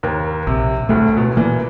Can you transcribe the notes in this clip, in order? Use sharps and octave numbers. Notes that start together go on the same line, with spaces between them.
D#2 A#4
A#1 C3
D2 A2 A3
B2
A#2 E3 A#3